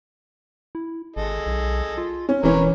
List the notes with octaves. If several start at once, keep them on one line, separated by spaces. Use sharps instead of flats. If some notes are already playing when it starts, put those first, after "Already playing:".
E4
G#1 G#4 A4 D#5
B1
F4
C#4
E1 E3 C#4 A#4 B4 C#5